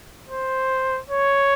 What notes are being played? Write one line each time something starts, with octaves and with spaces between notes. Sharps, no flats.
C5
C#5